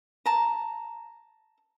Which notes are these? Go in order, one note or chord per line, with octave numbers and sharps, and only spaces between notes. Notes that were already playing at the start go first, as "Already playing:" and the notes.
A5 A#5